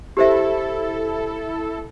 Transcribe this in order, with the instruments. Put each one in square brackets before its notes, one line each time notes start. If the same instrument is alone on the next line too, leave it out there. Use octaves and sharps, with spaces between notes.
[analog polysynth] E4 A4 [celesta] G4 C5 E5